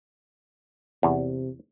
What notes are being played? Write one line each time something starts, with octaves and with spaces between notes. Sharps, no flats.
E2 C3